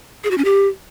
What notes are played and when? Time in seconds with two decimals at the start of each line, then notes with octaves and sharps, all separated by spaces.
0.24 G#4
0.31 F#4
0.38 C#4
0.45 G4